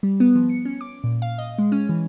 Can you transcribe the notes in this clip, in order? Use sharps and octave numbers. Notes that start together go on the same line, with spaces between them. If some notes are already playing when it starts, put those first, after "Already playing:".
G3
B3
F3
C#7
C#4
D6
A#2
F5
D#5
G#3
C#4
E3